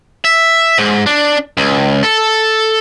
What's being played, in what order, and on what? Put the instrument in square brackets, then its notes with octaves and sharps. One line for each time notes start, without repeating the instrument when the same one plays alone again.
[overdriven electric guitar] E5
G#2
D4
C#2
A4